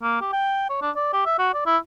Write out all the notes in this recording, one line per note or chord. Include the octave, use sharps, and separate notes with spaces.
A#3
G4
G5
C#5
D4
D5
G4
E5
F#4
D5
E4